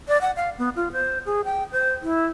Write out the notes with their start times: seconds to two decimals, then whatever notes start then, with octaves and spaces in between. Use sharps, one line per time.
0.08 D5
0.21 F#5
0.36 F5
0.59 B3
0.76 F4
0.93 C5
1.26 G#4
1.45 G5
1.72 C5
2.02 E4